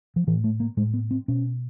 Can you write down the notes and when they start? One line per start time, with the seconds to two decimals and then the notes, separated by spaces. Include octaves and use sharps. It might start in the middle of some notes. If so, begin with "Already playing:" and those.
0.16 F3
0.27 A2 E3
0.44 A3
0.60 A#3
0.77 A2 G#3
0.94 B3
1.11 C4
1.28 B2 C#4